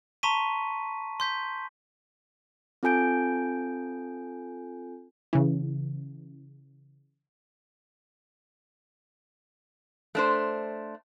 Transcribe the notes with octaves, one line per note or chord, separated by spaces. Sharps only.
A5 A#5 C6 C#6 B6 D#7
C6 G6 B6
C4 F4 A4 G#5 G6 D7
C#3 E3
A3 D4 C5